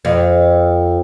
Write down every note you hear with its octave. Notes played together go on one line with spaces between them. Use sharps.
F2